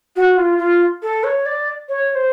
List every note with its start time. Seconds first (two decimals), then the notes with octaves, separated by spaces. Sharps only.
0.16 F#4
0.37 F4
0.58 F4
1.02 A4
1.23 C#5
1.45 D5
1.88 C#5
2.10 C#5
2.15 C5